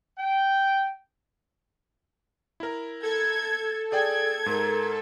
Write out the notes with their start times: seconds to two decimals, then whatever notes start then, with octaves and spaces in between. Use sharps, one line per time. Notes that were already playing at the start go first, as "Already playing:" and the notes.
0.17 G5
2.60 E4 A#4
3.03 A4 G#6
3.92 G#4 D5 G5 G#6
4.46 G#2 A#4